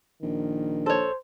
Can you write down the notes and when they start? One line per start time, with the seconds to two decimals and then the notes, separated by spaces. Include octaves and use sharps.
0.22 A#1 D#3
0.86 A4 C5 C#5